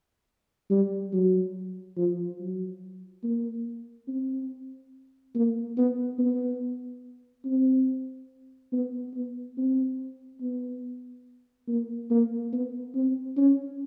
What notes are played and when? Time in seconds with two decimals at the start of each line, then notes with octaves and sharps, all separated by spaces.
0.70 G3
1.13 F#3
1.97 F3
2.40 F#3
3.24 A#3
4.08 C4
5.35 A#3
5.78 B3
6.19 B3
7.45 C4
8.73 B3
9.14 B3
9.57 C4
10.41 B3
11.68 A#3
12.10 A#3
12.52 B3
12.95 C4
13.37 C#4